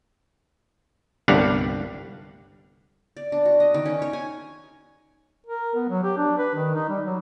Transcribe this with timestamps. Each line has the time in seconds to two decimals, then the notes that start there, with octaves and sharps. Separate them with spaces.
1.28 G1 C2 G3 D4 F5 F#5
3.17 D5
3.32 D4
3.45 F#4
3.60 D#5
3.74 D#3
3.86 C#4
4.02 C#5
4.13 G#5
5.46 A#4
5.75 B3
5.89 F#3
6.03 G4
6.17 D4
6.38 B4
6.55 D#3
6.75 D#4
6.89 G3
7.05 F#3